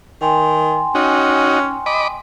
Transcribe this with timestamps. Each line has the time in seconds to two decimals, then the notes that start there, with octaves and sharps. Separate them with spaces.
0.21 D#3 G5 G#5 C6
0.95 C#4 D#4 F#4
1.86 D#5 B5 D6